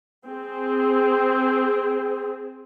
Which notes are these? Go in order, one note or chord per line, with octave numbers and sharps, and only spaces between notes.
C4 G#4